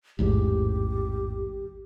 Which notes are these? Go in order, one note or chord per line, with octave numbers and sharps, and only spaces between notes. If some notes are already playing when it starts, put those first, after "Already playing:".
A1 E2 G#2 G4